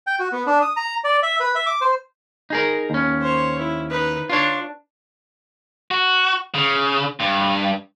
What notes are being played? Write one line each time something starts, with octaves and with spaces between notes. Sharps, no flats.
G5
F#4
B3
D4
D#6
A#5
D5
E5
B4
E5
D6
C5
D#4 G#4 A#4
D#2 C#4
C5 C#5
E4
D#4 B4
D4 F4 C#5
F#4
C#3
G2